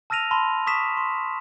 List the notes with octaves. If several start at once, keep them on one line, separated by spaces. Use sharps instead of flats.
A5 E6 F6 A#6 D#7 F7
A5 B5 C6
C#6 D#6 B6 E7
C6